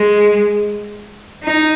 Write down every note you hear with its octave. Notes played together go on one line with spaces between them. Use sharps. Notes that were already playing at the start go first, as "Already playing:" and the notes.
Already playing: G#3
D#4